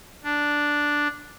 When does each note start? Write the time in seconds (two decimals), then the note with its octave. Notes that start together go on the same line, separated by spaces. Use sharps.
0.24 D4